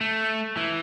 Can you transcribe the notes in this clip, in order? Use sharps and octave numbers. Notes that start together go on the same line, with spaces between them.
A3
E3